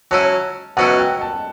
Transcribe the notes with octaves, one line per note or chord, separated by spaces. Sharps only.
F#3 C#4 E4 A5
B2 F#3 C#4 E4 F#5
G5
A5